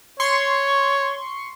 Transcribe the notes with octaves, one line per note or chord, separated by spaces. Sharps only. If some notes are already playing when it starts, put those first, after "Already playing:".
C#5 C6 C#6